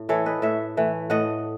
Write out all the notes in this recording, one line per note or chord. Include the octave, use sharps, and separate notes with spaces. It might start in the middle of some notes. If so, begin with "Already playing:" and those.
Already playing: A2
E3 A3 A4 C#5
B4 D#5
A2 C#5 E5
E3 A3
A2 D#5 F#5